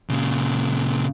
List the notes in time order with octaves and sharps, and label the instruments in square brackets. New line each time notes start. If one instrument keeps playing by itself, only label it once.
[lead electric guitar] A#2 C#3